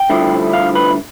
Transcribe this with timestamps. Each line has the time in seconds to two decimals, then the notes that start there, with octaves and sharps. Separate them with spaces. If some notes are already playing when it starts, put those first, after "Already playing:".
Already playing: G5
0.10 G2 D3 F3 A3 E4
0.53 F5
0.75 B4